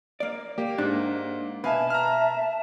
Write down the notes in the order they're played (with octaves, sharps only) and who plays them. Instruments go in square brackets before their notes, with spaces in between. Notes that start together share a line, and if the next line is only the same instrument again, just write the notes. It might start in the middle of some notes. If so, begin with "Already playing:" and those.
[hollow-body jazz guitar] A#3 D5
[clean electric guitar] A#3 [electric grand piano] G4
[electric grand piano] G#2 [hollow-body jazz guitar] D4
[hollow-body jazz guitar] B2 [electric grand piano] B4 F5 G#5 [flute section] E5 A5
[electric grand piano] A#5 F6